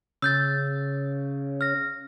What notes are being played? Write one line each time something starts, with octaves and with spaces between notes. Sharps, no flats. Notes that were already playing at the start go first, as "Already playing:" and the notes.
C#3 E6 G6 A6
F6 A#6